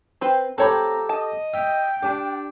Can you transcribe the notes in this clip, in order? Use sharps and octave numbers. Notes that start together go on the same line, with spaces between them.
C4 B4 C5
F3 A3 C4 G4 A4 C#5 A#5 B5
D#5 A5
E5 G5
D4 G4